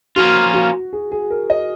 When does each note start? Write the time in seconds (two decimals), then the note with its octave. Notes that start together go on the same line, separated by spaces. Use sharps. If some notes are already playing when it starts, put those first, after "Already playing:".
0.16 F3 A#3 C#4 F4 F#4
0.53 F#4
0.93 G#4
1.12 G#4
1.30 A#4
1.50 D#5